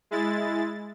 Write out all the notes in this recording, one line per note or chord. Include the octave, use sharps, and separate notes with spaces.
G#3 E4 A6